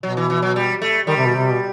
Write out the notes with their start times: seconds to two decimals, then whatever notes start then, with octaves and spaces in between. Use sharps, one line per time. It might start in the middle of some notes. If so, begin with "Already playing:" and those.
0.03 B2 F#3
0.17 E3
0.30 E3
0.42 F#3
0.56 G3
0.82 A3
1.07 D#3 G3
1.17 C3
1.26 B2
1.36 C3
1.51 B2